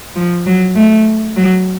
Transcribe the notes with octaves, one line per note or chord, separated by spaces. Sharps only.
F3
F#3
A3
F#3